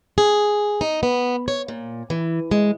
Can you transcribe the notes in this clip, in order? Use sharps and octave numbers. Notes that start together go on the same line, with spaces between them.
G#4
D#4
B3
C#5
A#2
E3
G#3